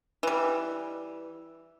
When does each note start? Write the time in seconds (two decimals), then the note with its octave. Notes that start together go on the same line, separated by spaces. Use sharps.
0.23 E3 G3